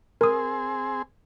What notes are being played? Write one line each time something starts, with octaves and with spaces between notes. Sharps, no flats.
C4 G#4 A#4 D#6